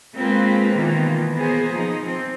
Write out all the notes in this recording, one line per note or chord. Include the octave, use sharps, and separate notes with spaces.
G#3 A#3 C4 F4 B4
B2 D#3 E3 A#3 F4
A#3 B3 G#4 C5
F3 D#4
F3 C4